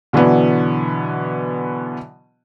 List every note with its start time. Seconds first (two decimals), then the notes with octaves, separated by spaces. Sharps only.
0.13 B2 D3 E3 F#3 B3